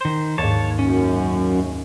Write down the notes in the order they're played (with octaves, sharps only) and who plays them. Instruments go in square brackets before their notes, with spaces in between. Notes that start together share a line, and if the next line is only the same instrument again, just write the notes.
[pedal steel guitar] D#3 C5
[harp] D#2 G#2 [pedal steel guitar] C#5 A5
[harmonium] F#2 [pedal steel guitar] C#4